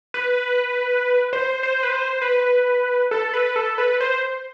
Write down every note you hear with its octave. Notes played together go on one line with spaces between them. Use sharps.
B4
C5
C5
B4
C5
B4
A4
B4
A4
B4
C5